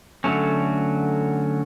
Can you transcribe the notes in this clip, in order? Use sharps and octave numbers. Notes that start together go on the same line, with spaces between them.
D3 F#3 A3 C#4